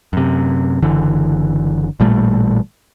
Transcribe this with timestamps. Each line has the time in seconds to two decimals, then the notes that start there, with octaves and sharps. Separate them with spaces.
0.13 F#2 C3
0.82 F#1 D3 E3
2.00 A1 A#2 G3 A3